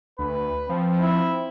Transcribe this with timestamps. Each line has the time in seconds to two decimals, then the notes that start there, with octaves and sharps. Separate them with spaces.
0.19 D2 B4
0.69 F3 C4
1.01 E4